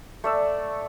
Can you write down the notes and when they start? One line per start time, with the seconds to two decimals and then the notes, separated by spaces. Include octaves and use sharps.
0.24 A3 D5 E6